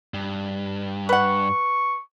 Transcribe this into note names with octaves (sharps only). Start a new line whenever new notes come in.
G2
B4 F#5 C#6